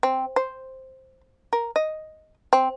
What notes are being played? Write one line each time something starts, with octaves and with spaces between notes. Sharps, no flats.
C4
C5
A#4
D#5
C4